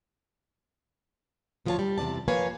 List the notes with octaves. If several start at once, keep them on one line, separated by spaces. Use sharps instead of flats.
D2 F3 F4 G4 C#5 A5
G3
E2 C3 D#3 D5 A5
F3 A#3 B4 C#5 F5 G#5